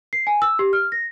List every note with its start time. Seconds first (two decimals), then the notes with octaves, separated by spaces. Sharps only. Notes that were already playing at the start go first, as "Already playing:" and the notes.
0.13 C7
0.27 G#5
0.42 E6
0.59 G4
0.73 F6
0.92 A#6